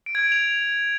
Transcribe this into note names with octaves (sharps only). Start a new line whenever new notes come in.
D7
G#6
D7
F7